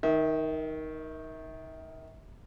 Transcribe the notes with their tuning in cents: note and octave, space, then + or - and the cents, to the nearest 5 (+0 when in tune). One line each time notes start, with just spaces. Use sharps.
D#3 +10 E5 -35